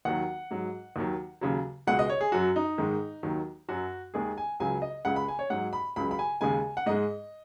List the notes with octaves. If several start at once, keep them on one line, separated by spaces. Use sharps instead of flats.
D#2 D#3 F#3 F#5
G#2 F#3
D#2 D#3 F#3
D#2 C#3 F#3
C#2 B2 G#3 F#5
D#5
C#5
G#4
F#2 F#3 F#4
D#4
G#2 D#3 G#3
D#2 D#3 F#3
F#2 F#3 F#4
D#2 D#3 G#3 G#4
G#5
C#2 C#3 F#3 G#5
D#5
C#2 C#3 G#3 F#5
B5
G#5
C#5
G#2 F#3 F#5
B5
C#2 C#3 F#3 B5
B5
G#5
D#2 C#3 G#3 G#5
F#5
G#2 G#3 D#5